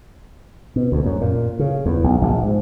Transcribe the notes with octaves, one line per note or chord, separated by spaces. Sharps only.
B2
D2
F#2
A#2
C#3
E2
B1
A#1
G#2